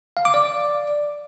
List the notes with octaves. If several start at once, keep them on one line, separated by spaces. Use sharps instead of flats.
F5
D6
D5